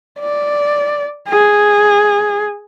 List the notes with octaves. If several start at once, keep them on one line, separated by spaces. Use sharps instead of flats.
D5
G#4